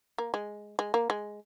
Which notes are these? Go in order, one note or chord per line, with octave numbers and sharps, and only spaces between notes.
A#3
G#3
G#3
A#3
G#3